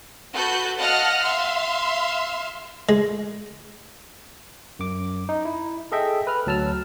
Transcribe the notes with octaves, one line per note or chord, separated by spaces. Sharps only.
F#4 A4 B4 F#6 G6
D#5 F5 F#5 A5 F6 F#6
E5 F5 C6
G#3
F#2 D6
D#4
E4
G#4 A4 D#5 E5 G5
B4 F6
D2 F#3 A5 E6 F6